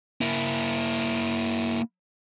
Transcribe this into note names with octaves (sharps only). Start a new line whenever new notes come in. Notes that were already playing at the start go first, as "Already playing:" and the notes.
A#3 E4